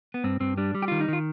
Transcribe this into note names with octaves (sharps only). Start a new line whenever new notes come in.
B3
G2 C4
G2 C4
G3 D4
G3
G4
D#3 F4
D#4
D#3 F4